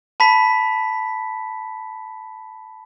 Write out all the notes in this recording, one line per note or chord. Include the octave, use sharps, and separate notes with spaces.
A5 B5 B6